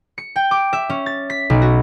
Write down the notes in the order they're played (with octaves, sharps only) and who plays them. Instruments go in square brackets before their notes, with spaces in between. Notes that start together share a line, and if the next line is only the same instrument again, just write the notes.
[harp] C#7
G5
D6
E5
C#4
A6
B6
B1
F#4